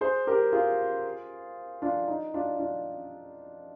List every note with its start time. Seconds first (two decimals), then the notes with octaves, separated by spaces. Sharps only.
0.01 G#4 C5
0.27 G4 A#4
0.52 F4 G#4
1.82 D4 F4
2.08 D#4
2.34 D4 F4
2.59 D4 F4